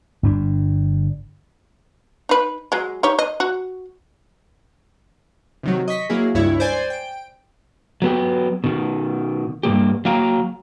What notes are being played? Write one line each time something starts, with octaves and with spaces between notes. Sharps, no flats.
G1 G2 D4
D#4 B4
F#3 G#3
D#4 G4 C#5
D#5
F#4
C3 D#3 F#3
D#5 C#6 B6
F#3 A#3 E4 G#4
C#2 G2 E4 C#5
C5 D5 G#5
G5 D7
F#3 B3 G4
B2 D#3
G2 C3 A#3 G4
F#3 A#3 F5 G5 A#5